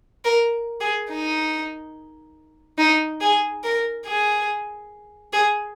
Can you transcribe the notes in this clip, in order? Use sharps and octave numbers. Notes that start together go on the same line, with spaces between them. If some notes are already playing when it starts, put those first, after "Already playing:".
A#4
G#4
D#4
D#4
G#4
A#4
G#4
G#4